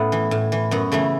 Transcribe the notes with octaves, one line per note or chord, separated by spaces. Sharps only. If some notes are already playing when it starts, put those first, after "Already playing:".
Already playing: A2 A3 B3 C#4
E3
A2
E3
F#2 B3
C#3 E3 A3